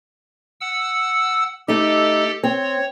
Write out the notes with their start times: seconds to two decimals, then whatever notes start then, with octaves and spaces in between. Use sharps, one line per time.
0.61 F#5 E6
1.68 A3 D#4 G4 A4
2.43 C4 C#5